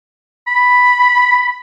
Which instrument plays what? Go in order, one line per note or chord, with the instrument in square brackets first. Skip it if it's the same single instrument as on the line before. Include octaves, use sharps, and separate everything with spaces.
[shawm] B5